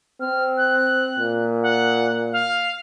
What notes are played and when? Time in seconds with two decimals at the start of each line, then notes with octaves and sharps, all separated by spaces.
0.21 C4 F6
0.57 F#6
1.18 A#2
1.63 F#5
2.33 F5